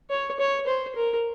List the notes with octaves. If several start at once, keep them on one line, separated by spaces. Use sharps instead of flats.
C#5
C#5
C5
A#4